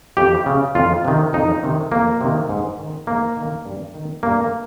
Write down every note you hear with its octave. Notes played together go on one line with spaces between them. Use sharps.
F2 G4
C#3
F2 F4
C3 D#3
F2 D#4
C3 D#3
F2 A#3
C3 D#3
G#2
D#3
G#2 A#3
D#3
G2
D#3
G2 A#3